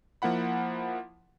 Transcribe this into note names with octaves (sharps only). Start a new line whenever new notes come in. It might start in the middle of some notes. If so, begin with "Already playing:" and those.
F3 A#3 E4 F#5 B5